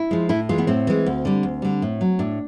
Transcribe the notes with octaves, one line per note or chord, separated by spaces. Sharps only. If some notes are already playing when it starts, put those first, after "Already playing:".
Already playing: E4
F3 G#3
A2 E4
E3 G#3 F4
B3
A2 C4
E3 G#3
D2
D3 G3
D2
D3 G3
A2
F#3
A2 D4